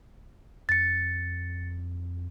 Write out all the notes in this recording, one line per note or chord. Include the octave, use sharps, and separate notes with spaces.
F2 A6 C#7